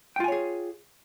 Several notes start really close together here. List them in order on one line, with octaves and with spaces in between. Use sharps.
G5 F4 G#5 C#5 G#4